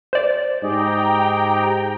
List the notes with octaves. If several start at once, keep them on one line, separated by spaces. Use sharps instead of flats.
C5 D5
G#2 G4 G#4 D#5 G5 A#5